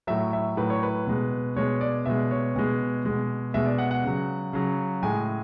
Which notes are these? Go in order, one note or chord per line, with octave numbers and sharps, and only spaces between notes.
A2 F#3 E5
E5
A2 F#3 B4
C#5
B4
B2 G#3
B2 G#3 C#5
D5
B2 G#3 E5
C#5
B2 G#3 G#5
B2 G#3
B2 G#3 E5
D5
F#5
F#5
C#3 F#3
C#3 F#3
A2 G#3 G#5